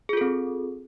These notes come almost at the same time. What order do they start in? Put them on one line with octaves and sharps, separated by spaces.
G#4 F4 A4 C4